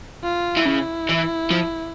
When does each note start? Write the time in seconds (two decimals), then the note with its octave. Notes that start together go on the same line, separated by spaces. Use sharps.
0.23 F4
0.57 E3
0.66 C#3 E4
1.09 E3
1.51 F3